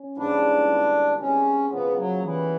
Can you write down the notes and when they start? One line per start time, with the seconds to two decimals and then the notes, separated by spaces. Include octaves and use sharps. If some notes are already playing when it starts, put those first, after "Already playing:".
Already playing: C#4
0.16 G#2 E3 G3 A#3 D4
0.68 D3 G3 B3
1.20 G#3 C4 C#4 D#4 F#4
1.71 C#3 F3 A#3 B3
1.97 F#3
2.23 E3 G3 B3 E4